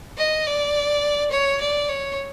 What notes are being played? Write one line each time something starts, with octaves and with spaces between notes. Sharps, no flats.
D#5
D5
C#5
D5
C#5